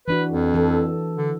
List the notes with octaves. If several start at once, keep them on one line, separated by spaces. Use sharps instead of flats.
E3 D4 F#4 B4
F2
E3 A4
D3